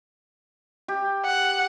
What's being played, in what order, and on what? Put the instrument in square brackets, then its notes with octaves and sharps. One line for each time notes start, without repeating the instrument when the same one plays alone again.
[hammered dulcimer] G4
[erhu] F#5